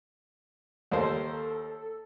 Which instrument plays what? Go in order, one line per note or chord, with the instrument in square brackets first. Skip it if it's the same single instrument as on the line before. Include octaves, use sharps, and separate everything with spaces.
[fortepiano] D#2 A#3 C5 [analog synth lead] A4